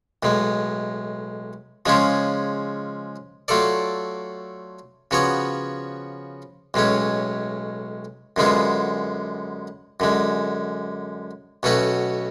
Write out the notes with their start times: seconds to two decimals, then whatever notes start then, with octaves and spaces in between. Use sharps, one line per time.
0.23 B1 A2 G#3
1.86 C#3 F3 G#3 C#4 F4
3.48 F#3 A3 F4 A4 D5
5.11 C#3 F3 B3 F#4 C#5
6.74 B1 A2 G#3 C#4
8.36 F#2 D3 G#3 B3 F4
10.00 F#2 D3 G#3
11.63 B1 B2 A3 C#4 F#4